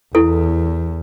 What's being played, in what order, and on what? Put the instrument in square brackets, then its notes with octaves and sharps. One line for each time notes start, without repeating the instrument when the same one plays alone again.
[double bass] E2 [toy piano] E4 A4